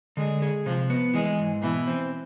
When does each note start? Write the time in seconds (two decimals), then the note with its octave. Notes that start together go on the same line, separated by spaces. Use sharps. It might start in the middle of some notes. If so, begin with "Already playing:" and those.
0.17 D3 G#3
0.42 G#4
0.66 C3 F3
0.90 B3
1.14 E3 G#3
1.39 G#2
1.62 B2 E3
1.87 C4